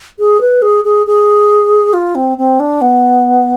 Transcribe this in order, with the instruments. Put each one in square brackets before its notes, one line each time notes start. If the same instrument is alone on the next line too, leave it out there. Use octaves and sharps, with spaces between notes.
[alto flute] G#4
B4
G#4
G#4
G#4
F4
C4
C4
D4
B3